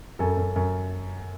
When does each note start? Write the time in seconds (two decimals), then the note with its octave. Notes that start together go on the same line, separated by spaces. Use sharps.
0.19 F#2 A4
0.37 F#2
0.56 F#2